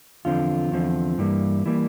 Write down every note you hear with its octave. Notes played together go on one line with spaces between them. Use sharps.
E2 D3 F3 C4 F4
E2 D3 F3 C4
G2 E3 G3 A#3
E3 G3 A#3